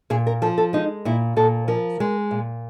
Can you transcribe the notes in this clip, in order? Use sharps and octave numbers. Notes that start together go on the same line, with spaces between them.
A#2 G#4
A#4
F3 A4
A4
G#3 D#4
A#2 E4
A#2 A4
F3 A#4
G#3
A#2